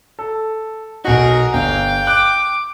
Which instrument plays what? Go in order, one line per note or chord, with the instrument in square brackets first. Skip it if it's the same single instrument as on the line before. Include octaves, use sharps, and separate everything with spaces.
[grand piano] A4
[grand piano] B1 D#4 [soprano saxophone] F#4 [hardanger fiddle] G#4 A#4
[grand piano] G1 [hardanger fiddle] F5 [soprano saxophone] G5
[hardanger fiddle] D6 [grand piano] F#6